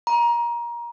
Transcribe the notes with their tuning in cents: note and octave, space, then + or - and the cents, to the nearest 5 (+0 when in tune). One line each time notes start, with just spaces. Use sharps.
A#5 +25